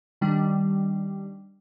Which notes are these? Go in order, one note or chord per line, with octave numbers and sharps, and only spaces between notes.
D#3 G3 D4